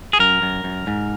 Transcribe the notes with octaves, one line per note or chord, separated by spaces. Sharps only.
G#4
F#2 A#4
F#2
F#2
G#2